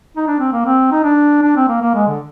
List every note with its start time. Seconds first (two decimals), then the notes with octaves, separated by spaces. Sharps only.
0.16 D#4
0.27 D4
0.39 C4
0.52 A#3
0.65 C4
0.92 D#4
1.04 D4
1.42 D4
1.56 C4
1.68 A#3
1.82 A#3
1.94 G#3
2.08 D3